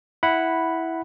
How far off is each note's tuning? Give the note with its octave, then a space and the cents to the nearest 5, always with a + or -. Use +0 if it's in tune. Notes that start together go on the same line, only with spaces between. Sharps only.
E4 -5 F#5 +0 B5 +0